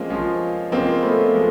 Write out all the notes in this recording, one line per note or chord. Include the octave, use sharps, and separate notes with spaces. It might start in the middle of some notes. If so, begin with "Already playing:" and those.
Already playing: F3 G#3 A#3 C4 C#4 F4
F3 G#3 C#4 F4
F3 G#3 A#3 C4 C#4 F4
A3 B3
F3 G#3